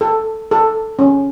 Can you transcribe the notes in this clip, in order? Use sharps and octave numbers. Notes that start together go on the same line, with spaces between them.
A4
A4
C#4